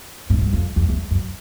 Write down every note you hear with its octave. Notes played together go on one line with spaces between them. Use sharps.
G#2
G2
F2
E2
E2
F#2